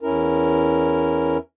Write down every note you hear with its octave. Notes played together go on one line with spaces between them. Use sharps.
E2 C#4 E4 A#4